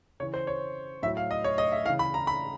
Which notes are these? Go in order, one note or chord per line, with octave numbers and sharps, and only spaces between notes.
C#3 E3 C#5
C5
C#5
A2 F#3 E5
F5
D#5
C#5
D#5
E5
C#3 E3 F5
B5
A#5
B5